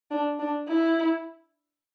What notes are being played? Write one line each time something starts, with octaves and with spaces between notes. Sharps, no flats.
D4
D4
E4